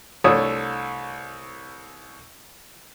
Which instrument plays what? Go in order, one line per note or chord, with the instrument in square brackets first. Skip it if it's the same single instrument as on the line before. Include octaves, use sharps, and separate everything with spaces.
[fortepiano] C2 A3 D4 C#5 D#6